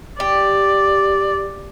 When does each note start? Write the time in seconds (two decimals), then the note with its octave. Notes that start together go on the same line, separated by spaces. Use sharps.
0.20 G4 D5